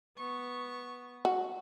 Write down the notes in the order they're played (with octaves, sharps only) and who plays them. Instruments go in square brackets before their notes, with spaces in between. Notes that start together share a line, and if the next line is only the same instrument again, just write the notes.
[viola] B3 C#6
[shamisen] F#4